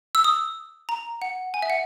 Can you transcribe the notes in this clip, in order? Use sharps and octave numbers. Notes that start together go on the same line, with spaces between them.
E6
D#6
A#5
F#5
G#5
E5
F#5